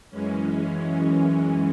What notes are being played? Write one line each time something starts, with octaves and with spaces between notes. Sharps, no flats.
F#2 E3 G#3 C#4